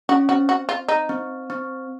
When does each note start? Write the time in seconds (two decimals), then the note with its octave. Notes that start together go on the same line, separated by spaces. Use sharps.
0.09 C#4 F#4
0.29 C4 F#4
0.49 F#4
0.69 F4
0.88 D#4
1.09 C4
1.50 C4